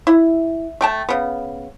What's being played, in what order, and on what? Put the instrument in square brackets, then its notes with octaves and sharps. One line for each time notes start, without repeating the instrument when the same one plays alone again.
[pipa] E4
A3 G5 A5
C#3 B3